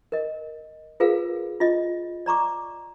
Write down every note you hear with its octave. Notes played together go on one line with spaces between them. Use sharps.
A#4 D#5
F4 G#4 A#4 B4 F5
F4 D#5
D5 A#5 C#6 D6